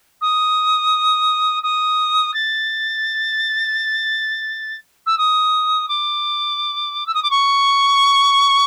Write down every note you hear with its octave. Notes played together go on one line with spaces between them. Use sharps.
D#6
D#6
A6
E6
D#6
D6
E6
D#6
D6
C#6